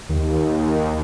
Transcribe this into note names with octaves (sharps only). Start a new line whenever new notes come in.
D#2